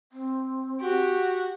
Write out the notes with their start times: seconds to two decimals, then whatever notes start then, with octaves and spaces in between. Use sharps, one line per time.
0.12 C4
0.81 F#4 G4